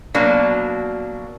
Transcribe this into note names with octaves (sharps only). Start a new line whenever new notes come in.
B2 F#3 A#3 D4